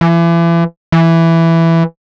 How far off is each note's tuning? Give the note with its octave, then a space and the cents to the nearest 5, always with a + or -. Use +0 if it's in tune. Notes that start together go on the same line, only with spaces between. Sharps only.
E3 +35
E3 +5